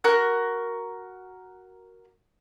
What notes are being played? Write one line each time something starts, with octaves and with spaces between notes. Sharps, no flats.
F#4 A#4 F#6